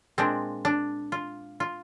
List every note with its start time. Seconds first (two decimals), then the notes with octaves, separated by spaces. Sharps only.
0.18 A#2 G#3 C4 D4
0.65 D4
1.12 F4
1.60 F4